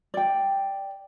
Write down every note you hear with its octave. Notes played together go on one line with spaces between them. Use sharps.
D5 G5